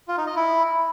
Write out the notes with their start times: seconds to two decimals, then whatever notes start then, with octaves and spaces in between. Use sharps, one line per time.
0.08 F4
0.17 D#4
0.27 D#5
0.36 E4